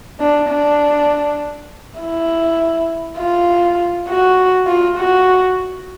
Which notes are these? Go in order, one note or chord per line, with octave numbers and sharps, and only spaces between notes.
D4
D4
E4
F4
F#4
F4
F#4